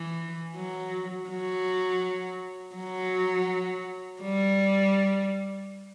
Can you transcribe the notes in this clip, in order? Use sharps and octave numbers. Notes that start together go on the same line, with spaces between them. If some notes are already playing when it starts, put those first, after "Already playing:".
Already playing: E3
F#3
F#3
F#3
G3